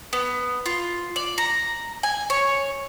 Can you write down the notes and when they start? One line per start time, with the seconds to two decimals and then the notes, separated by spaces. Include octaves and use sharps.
0.13 B3
0.66 F4
1.16 D5
1.38 A#5
2.03 G#5
2.30 C#5